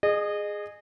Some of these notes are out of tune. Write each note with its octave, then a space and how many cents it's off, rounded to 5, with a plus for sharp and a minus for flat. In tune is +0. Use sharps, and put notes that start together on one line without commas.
G#4 +0 D#5 -30